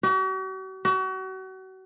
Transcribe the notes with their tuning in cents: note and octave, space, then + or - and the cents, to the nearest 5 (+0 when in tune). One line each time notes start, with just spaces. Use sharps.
F#4 +45
F#4 +35